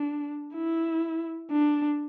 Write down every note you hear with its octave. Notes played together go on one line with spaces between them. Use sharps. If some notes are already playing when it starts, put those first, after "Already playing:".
Already playing: D4
E4
D4